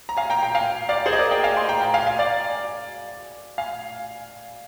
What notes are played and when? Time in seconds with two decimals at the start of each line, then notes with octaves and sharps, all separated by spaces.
0.09 A#5
0.17 F5 G#5
0.30 G5 A#5
0.43 G5 A#5
0.55 F5 G#5
0.89 D5 F5
1.06 G#4 C5
1.13 D#5
1.18 A#4 D5
1.31 D#5 G5
1.43 F5 G#5
1.56 G#5 C6
1.69 G5 A#5
1.81 G5 A#5
1.94 F5 G#5
2.07 F5 G#5
2.19 D5 F5
3.58 F5 G#5